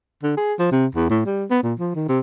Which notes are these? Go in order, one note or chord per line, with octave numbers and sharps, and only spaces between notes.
D3
G#4
F3
C3
E2
A2
G3
B3
A#2
F3
D#3
C3